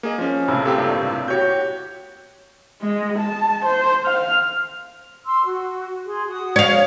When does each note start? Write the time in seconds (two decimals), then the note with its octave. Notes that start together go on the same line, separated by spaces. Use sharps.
0.03 A#3 G#4 D#5
0.18 F3 C#4
0.48 C#2 A2 C3
0.65 C4 G4 A4
0.77 G2 A#2
1.28 F#4 G4 C#5 G6
2.81 G#3
3.19 A5
3.65 C5
4.06 F5
5.25 C6 E6
5.45 F#4
6.06 G#4 C6
6.28 F#4 D#6
6.56 C#5 F5